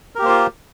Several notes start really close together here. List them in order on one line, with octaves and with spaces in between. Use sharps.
A#4 G4 A#3 C5 F4